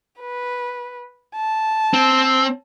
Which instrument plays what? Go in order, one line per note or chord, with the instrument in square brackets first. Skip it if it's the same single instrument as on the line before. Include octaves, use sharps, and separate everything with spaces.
[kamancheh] B4
A5
[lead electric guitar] C4